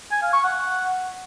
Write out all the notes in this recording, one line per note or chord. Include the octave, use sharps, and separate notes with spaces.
G#5
F5
C#6
F#5